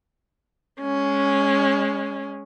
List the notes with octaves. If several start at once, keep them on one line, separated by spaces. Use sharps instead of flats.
G#3 C#4